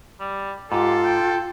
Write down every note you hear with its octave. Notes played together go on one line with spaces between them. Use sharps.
G3
G#2 F4 G4 A4
G5